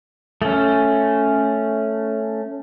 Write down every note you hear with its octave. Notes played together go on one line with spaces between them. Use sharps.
A3 C#4